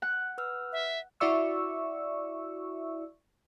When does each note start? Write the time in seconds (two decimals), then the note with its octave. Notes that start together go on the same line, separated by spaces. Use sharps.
0.02 F#5
0.38 B4 E6 F6
0.72 E5
1.20 E4 F#4 D5 E5 C#6 E6